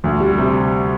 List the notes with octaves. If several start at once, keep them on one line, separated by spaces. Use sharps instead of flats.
D2
G3
C3